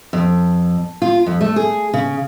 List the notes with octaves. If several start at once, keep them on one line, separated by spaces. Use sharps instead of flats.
F2
F4
F2
A3
G#4
C#3